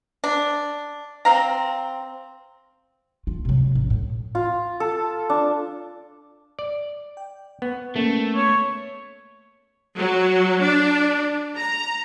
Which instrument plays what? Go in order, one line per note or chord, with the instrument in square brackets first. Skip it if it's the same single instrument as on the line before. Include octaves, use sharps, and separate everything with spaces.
[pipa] D4
C4 F5 A#5
[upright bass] F4
C3 F#3
G#3
A1
A2
[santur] F4
A4
D4
[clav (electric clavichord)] D5
[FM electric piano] G5
[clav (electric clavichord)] B3 [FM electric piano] C#6
[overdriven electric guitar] A3 [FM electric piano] A#3 C#4 A#4
[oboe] C#5
[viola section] F#3
D4
A#5